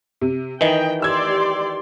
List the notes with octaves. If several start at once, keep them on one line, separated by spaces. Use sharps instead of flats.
C3
D#3 E3 D#5 G5
G4 D5 C6 E6 G#6